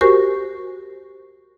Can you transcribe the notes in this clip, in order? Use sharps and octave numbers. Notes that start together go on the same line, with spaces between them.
F#4 G4 A#4 C5 G#5 C#6